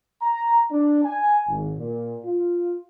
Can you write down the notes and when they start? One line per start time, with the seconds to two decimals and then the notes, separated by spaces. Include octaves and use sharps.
0.22 A#5
0.71 D4
1.05 G#5
1.48 G#1
1.78 A#2
2.24 F4